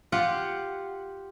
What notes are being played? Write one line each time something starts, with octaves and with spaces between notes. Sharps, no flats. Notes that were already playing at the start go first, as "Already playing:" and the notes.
F4 G4 F#5